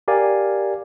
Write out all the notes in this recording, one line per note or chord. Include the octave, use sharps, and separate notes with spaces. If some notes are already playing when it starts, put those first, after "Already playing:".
G4 A#4 D5 F5 G#5